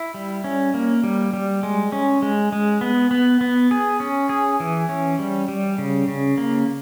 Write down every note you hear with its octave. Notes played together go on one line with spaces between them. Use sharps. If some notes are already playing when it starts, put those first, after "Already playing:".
Already playing: E4
G3
C#4
A#3
G3
G3
G#3
C#4
G#3
G#3
B3
B3
B3
G#4
C#4
G#4
E3
C#4
G3
G3
C#3
C#3
A#3